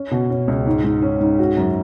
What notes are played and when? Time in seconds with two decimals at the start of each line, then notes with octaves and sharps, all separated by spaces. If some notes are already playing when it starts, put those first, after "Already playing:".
Already playing: C#4
0.11 B2
0.30 C#4
0.48 C#2
0.67 G#2
0.84 G#2
1.02 C#4
1.20 G#2
1.39 F#4
1.57 F#2